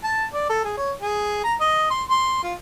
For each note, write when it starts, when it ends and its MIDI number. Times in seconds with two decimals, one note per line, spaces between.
0.04 0.25 81
0.34 0.47 74
0.49 0.62 69
0.65 0.73 68
0.77 0.92 73
1.01 1.44 68
1.44 1.54 82
1.60 1.88 75
1.90 2.03 84
2.09 2.39 84
2.43 2.53 65